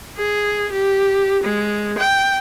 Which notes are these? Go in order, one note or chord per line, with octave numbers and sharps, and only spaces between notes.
G#4
G4
G#3
G5